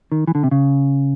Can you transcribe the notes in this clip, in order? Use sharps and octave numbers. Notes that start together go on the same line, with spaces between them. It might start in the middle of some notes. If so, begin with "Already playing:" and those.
D#3
E3
D3
C3
C#3